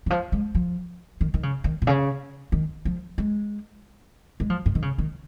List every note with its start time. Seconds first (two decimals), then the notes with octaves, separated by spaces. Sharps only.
0.06 D#3
0.10 F3
0.32 G#3
0.55 F3
1.21 D#3
1.34 D#3
1.43 C#3
1.64 D#3
1.82 A#2
1.87 C#3
2.52 D#3
2.85 F3
3.18 G#3
4.40 G#3
4.50 F3
4.66 G#2
4.75 D#3
4.82 C#3
4.98 D#3